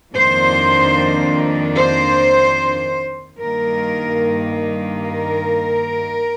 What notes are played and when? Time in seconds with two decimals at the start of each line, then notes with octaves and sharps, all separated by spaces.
0.14 F2 D#3 A#3 D4 C5
1.78 C5
3.42 G2 D#3 A#3 A#4
5.06 A#4